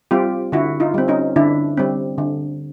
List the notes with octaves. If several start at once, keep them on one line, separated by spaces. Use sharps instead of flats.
G3 C4 F4 G4
D3 E4 F#4
D#4 F4
G3 C4
C#4 D#4
D3 D4 E4
G3 C4
D3